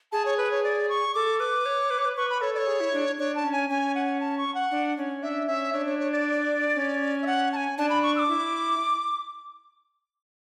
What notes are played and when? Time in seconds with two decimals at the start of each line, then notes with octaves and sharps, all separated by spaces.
0.12 G#4 A5
0.25 C#5
0.37 B4
0.51 C#5
0.64 D5
0.89 C#6
1.14 A4 D6
1.40 B4 D6
1.66 C#5
1.90 B4
1.98 C#5
2.05 B4
2.17 B4 C#6
2.30 B5
2.41 A4 C#5
2.54 D5
2.58 C#5
2.67 G#4
2.80 E4
2.93 D4
3.18 D4 C#5
3.35 A5
3.44 C#4
3.52 G#5
3.69 C#4 G#5
3.95 F#5
4.20 A5
4.38 C#6
4.55 F#5
4.71 D4
4.97 C#4
5.23 D4 E5
5.47 C#4 E5
5.73 D4 C#5
5.86 C#5
5.99 C#5
6.12 D5
6.75 C#4
7.22 E5
7.27 F#5
7.52 A5
7.56 G#5
7.77 D4 A5
7.90 B5
8.03 C#6
8.16 E6
8.19 D6
8.29 E4